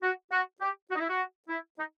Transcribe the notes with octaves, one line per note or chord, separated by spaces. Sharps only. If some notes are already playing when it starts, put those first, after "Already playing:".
F#4
F#4
G4
F#4
D#4
E4
F#4
E4
D#4